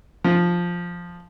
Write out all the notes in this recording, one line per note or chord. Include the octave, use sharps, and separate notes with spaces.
F3